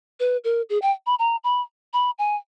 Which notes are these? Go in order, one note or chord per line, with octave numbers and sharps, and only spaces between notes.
B4
A#4
G#4
G5
B5
A#5
B5
B5
G#5